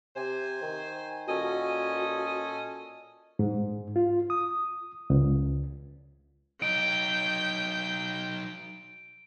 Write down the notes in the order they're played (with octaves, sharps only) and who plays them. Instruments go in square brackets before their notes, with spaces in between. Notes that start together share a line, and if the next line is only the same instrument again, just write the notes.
[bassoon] C3 [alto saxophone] C5 [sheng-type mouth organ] G#5
[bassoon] D#3
[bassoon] A#2 [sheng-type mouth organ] C#4 A4 G#5 [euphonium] F#4 [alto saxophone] D#5
[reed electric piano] G#2
F4
D#6
C#2
[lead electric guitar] F#3 D#4 [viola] G5 [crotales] D7